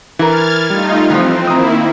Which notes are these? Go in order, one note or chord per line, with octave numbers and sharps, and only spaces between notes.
E3 E4 A#4 F6 G#6 A6
G3 A3 D#4 F4
E3 F3 C4
D#3 A#3 E4 A#5 D#6